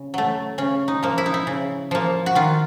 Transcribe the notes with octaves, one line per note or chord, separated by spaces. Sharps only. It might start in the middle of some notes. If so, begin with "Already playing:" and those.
Already playing: C#3
F#3 A3
C#3 C#4
D#4
F3 A#3
E4
D#4
E4
C#3
F3 A#3
F#4
D#3 F4